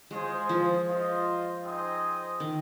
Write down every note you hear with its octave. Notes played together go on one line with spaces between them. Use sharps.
G#3 F4 G#4 C5 D#5
F3
F4 C5 D#5
C4 D#4 G#4 C5 D#5
D#3